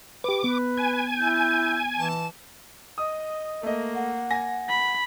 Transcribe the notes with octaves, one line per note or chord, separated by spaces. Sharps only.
G4 B4 D6
B3 B4
G#5
E4 G6
E3 A5
D#5 D#6
A3 A#3 D#5
F#5
G#5 A#6
B5